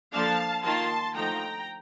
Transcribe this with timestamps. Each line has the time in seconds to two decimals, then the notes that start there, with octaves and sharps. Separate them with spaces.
0.13 D3 F3 A#3 D4 F5 A5
0.64 D#3 A#3 F4 A5 C6
1.15 D3 F3 A3 D#4 G5 A#5